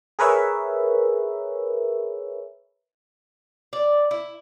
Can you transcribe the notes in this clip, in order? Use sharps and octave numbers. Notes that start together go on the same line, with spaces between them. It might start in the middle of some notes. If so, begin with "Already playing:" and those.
G#4 A#4 B4 C#5 E5
D5
E4